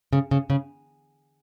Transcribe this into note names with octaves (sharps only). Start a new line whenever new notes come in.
C#3
C#3
C#3